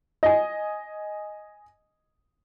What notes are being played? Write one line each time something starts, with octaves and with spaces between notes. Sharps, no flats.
D#5 G#5